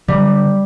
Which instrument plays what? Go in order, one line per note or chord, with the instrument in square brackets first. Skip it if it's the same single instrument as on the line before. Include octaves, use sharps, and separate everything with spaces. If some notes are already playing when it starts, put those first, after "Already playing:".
[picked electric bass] D3 [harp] G3